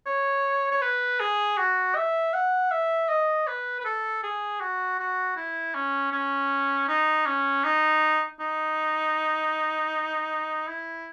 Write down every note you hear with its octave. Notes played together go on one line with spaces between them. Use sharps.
C#5
C#5
B4
G#4
F#4
E5
F#5
E5
D#5
B4
B4
A4
G#4
F#4
F#4
E4
C#4
C#4
D#4
C#4
D#4
D#4
E4